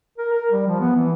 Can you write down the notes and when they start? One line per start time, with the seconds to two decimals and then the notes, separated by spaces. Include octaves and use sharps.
0.18 A#4
0.32 A#4
0.51 G3
0.67 F3
0.80 B3
0.96 E3